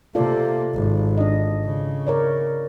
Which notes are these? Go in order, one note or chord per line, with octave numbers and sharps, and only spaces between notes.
C3 A#3 F4 A4 D5
G#1
D4 D#5
C#3
A#4 C#5 D5